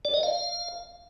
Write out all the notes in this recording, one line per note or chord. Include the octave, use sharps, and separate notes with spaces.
D5
D#5
F5